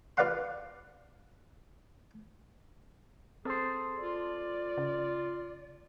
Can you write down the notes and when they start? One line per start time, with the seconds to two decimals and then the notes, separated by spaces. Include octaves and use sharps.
0.17 F4 B4 D5 F5 F#5 C6
3.45 C4 G#4 A4 C5
4.00 F4 D5
4.78 C#3